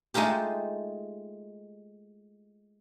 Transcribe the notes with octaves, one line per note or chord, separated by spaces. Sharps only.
G#3 A3 D#4 F4 G4